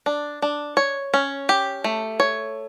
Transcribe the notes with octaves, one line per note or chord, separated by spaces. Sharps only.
D4
D4
C#5
C#4
G4
A3
C#5